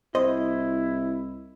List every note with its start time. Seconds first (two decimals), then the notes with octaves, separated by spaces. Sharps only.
0.15 C2 E4 C5 D#5